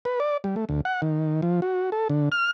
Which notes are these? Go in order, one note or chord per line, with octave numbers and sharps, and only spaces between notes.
B4
D5
G3
A3
D2
F#5
D#3
F3
F#4
A4
D3
F6